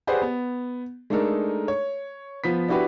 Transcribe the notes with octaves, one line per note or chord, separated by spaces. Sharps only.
G4 G#4 B4 C5 D5 F#5
B3
G#3 A3 D4 D#4 A4 A#4
C#5
F3 B3 B6
D4 E4 F#4 G4 B4